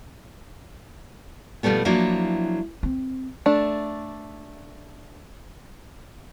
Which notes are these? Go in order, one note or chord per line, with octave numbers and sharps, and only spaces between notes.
B2 F3 G3 A3 B3
F3 F#3 A#3 D4 E4
C4
A3 D4